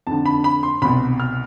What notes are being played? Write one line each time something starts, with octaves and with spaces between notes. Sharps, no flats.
F2 D3 A5
B5
B5
C6
C2 B2 B5
F6